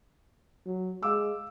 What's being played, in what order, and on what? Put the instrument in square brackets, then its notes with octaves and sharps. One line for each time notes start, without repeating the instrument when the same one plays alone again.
[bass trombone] F#3
[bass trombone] G#3 [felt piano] F5 D6 E6